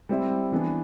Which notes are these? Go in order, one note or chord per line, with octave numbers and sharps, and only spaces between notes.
G3 C4 E4
E3 B3 D4